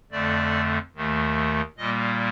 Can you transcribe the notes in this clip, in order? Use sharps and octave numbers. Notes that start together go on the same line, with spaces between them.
F2 D3 A3 D5
D#2 D#3 A3
A#2 G3 A#3 D#5